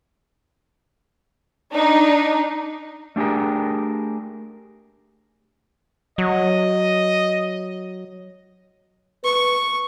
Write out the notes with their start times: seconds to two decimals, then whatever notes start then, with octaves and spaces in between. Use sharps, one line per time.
1.73 D4 D#4
3.16 A3 D4 G4 G#4 A#4
6.18 F#3 D#5
9.24 B4 C#6